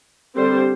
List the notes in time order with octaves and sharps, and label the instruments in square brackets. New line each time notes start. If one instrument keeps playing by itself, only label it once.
[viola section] D3 G3 C4 G4 C5